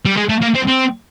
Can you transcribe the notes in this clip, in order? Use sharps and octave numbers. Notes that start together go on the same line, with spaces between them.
G3
G#3
A3
A#3
C4
C4